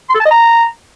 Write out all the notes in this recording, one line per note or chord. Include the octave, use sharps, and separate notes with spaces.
C6
A4
A5
D#5
A#5